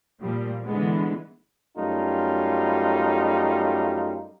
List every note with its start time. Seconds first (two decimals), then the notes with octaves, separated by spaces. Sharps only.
0.21 A#2 F3 G3
0.65 D3 E3 G#3 B3
1.77 F#2 G3 A3 D#4 F4